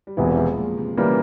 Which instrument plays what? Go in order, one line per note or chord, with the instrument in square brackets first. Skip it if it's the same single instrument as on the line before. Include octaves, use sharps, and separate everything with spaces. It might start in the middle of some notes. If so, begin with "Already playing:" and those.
[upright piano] G3
[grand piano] E1 E2 C3 E3 [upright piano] F3 G#3
[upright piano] F3 G#3
A#2
C3
[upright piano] A#2 C#3 [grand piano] E3 G3 A#3